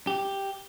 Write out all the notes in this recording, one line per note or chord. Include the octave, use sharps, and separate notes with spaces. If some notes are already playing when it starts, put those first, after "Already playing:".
G4